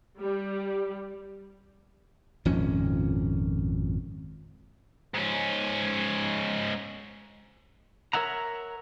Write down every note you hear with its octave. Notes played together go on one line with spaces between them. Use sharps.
G3
G#1 F2 A#2 C#4
G#2 C#4
A#4 C#5 E5 F#5 A#5